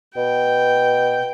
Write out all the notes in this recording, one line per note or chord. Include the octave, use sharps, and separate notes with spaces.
B2 G5